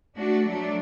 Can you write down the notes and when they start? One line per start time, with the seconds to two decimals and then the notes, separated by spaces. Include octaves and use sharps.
0.16 A3 D4 F#4
0.45 F#3 A3 D4